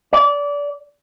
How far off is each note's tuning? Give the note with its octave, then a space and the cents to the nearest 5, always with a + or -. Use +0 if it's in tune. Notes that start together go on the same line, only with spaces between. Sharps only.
D5 -25